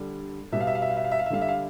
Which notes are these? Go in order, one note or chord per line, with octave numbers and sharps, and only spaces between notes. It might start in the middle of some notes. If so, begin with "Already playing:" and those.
Already playing: D3 G3
B2 G3 E5
F5
E5
F5
E5
F5
E5
F5
E5
F5
E5
D3 G3 F5
E5
F5